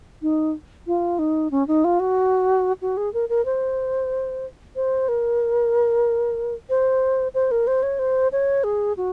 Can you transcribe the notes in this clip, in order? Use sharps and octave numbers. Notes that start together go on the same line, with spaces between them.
D#4
F4
D#4
C#4
D#4
F4
F#4
F#4
G#4
A#4
A#4
C5
C5
A#4
C5
C5
A#4
C5
C#5
C5
C#5
G#4
F#4